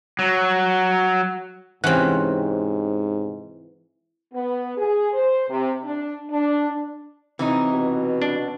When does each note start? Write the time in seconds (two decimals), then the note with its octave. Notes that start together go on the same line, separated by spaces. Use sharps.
0.19 F#3
1.84 G#2 C3 E3 C4 C#4 F#5
4.33 B3
4.76 G#4
5.12 C5
5.48 C3
5.84 D4
6.31 D4
7.39 C3 E3 F#3 D#4
7.73 B2
8.22 D4